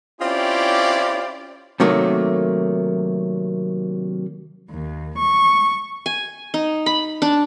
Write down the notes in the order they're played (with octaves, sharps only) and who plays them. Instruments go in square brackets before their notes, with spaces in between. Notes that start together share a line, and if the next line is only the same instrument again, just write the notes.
[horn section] C4 C#4 E4 F4 G4 D5
[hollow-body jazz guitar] C3 D#3 F#3 A3 A#3
[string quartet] D#2
C#6
[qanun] G#5
D#4
B5
D4